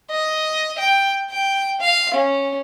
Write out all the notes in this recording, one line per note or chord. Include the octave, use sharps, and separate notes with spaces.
D#5
G5
G5
F5
C#4